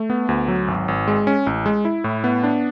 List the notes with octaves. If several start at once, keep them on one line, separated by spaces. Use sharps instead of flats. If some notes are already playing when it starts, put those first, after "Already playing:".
Already playing: A3
B3
D2
F#3
G#1
G#1
G#3
C#4
A1
G#3
E4
A2
B3
D4